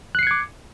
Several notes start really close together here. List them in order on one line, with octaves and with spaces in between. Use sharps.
F#6 C7 C#7 G#6 D6